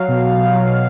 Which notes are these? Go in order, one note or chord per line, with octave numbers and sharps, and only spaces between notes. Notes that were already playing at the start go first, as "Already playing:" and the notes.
Already playing: F#3 F5
B2
B2
B2
F#3
B2